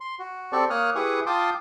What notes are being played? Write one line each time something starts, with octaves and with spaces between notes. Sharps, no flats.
C6
F#4
C4 G4 A4 D5 C#6
A#3 C#5 D#6 F6 F#6
E4 G4 G#4 B4 C#6 D#6
F4 G5 A5 C6 D6 D#6